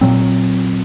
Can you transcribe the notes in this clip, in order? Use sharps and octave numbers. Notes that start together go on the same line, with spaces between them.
A#2 F#3 C4